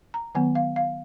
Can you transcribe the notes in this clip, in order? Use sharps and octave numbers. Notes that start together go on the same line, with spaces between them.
A#5
D#3 F#3 B3 G#5
F5
F5